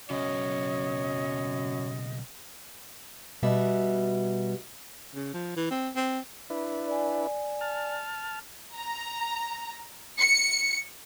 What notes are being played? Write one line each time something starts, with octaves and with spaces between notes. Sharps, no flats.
B1 F#2 C#3 C#5 D#5
B2 G3 F#4 E5
C#3
F3
E3
C4
C4
D4 E4 B4
D5 G#5
A5 F6
A#5
C#7